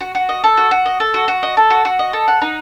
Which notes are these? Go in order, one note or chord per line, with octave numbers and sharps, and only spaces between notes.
F#4
F#4
D#5
A4
F#4
F#4
D#5
A4
F#4
F#4
D#5
A4
F#4
F#4
D#5
A4
F#5
D#4